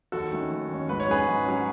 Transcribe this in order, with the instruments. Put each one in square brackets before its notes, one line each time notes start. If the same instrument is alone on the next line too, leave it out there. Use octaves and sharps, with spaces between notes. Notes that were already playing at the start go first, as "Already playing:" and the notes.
[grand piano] D#2 F#4 A4
D#3 A3 C#4
D#2
D#3 A3 C#4
G#2 B4
C#5
F#3 C#4 G#4 B4
G#2
F#3 C#4